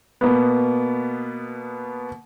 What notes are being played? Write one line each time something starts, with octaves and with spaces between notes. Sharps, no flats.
B2 A#3 B3